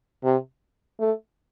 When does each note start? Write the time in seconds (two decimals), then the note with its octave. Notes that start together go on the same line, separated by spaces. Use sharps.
0.24 C3
0.99 A3